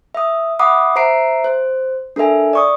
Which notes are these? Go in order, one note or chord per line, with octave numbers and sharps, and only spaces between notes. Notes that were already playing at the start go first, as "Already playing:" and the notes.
E5 D#6
E5 F#5 B5 D6 D#6
C5 E5 A#5 C7 D7
C5
D4 A4 A#4 E5 G#5
D5 C#6 D#6